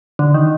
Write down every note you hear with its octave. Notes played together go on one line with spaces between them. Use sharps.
D3
D#3